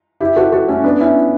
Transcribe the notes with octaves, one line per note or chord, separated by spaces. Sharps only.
E4 G4
F#4 A4
F#4 A4
A3 C#4
B3 D4
C#4 E4